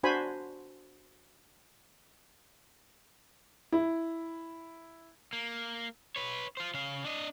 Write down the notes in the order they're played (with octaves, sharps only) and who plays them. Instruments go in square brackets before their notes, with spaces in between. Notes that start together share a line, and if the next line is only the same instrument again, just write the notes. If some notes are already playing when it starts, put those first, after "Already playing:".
[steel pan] D4 F#4 C5 G#5 B5
[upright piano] E4
[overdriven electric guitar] A#3
B4 C#5
F4 C5
C#3 F5
D4 D#5